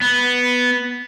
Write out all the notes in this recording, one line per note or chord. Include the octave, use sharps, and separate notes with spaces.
B3